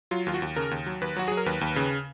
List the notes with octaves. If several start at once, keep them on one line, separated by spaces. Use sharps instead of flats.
F#3 F4
D#2 F4
F#4
D#2
C#3 A#4
D#2
F#3
D#2 B4
F#3 F#4
F#3 G#4
A#4
D#2 B4
D#2
C#3